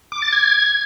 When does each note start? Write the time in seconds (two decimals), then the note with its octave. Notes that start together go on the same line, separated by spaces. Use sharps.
0.12 D6
0.22 A6
0.32 G#6